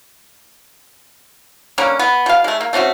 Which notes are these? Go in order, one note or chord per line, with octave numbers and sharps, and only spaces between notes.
D3 G3 A#3 C#4
B3
B2 F5
G#3 A3
A#3
A3 C4 C#4 F#4